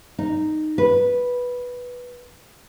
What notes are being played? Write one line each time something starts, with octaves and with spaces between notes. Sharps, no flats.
D#4
B4